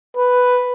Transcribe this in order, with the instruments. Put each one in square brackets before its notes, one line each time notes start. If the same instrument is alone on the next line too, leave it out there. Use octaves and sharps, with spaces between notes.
[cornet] B4